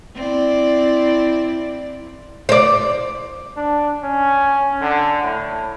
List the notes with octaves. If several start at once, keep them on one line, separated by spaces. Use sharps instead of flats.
C4 E4 D5
C5 D5
D4
C#4
D3
A2